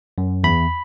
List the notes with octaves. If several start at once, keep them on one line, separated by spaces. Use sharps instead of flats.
F#2
E2 B5